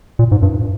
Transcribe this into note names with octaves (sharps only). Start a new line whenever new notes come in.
A#2
G#2
G2